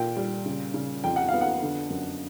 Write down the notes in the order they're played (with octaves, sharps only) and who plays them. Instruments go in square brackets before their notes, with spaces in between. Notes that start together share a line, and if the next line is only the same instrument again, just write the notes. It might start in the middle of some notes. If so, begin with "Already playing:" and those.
Already playing: [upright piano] A#2 G5
G3
C#3
C#3
F2 G5
F#5
B3 F5
F#5
D3
F#2